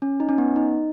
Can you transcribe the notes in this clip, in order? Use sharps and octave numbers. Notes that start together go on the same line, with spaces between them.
C#4
D#4
C#4
B3
D#4